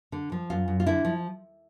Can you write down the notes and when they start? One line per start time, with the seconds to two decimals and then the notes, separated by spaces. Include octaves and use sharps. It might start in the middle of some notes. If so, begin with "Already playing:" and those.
0.12 D3
0.32 F3
0.50 F#2 F4
0.68 F#2
0.80 F4
0.86 D3 E4
1.05 F3